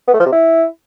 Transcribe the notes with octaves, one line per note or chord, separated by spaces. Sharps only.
B3
A3
F3
C3
E4